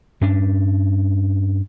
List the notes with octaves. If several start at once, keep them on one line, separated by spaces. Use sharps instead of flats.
G2 C#4 D4